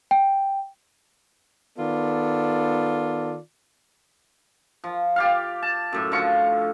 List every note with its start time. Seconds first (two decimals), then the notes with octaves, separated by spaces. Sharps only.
0.11 G5
1.79 D#3 B3 F4 A4 D5
4.84 F3
5.16 G4 D5 F5
5.62 A5
5.93 F#2 A2
6.12 D3 F3 F5 C#6